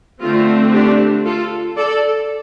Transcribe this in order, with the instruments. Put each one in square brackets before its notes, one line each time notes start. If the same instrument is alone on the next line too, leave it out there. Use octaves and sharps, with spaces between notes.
[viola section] D3 A3 C4 F4
D4 G4
F4 A4
A4 D5